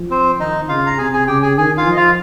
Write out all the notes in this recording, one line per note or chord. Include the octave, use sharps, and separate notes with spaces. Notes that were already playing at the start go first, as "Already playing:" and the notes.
Already playing: F3
C4 C5
D#3 D#4 D#5
C#3 F4 F5
A#5
C3 G#4 G#5
G#4 G#5
C#3 G4 G5
G#4 G#5
D#3 G#4 G#5
F4 F5
F3 D#5
F4 F5